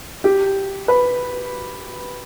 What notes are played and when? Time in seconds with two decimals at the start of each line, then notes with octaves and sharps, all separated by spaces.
0.24 G4
0.88 B4